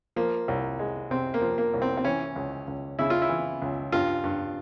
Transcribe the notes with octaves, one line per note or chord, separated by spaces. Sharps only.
F3 A#3
C2
G#3
C3 C4
A#3
F3
A#3
C2
C4
C4
E3 C#4
C#2
C#2
C#3 E4
F4
E4
E3
C#2
G2 F4
G2